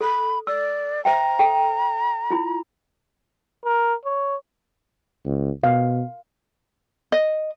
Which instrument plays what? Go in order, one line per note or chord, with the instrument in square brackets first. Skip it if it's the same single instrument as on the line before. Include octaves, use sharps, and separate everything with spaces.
[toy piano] A4 [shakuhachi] B5
[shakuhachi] D5 [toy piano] E6
[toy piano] C5 E5 G5 [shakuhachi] A#5
[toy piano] A4 G5
E4 F4 B5
[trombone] A#4
C#5
[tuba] C#2
[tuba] B2 [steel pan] F5
[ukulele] D#5